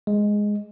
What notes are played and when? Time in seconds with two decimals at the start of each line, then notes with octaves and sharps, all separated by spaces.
0.07 G#3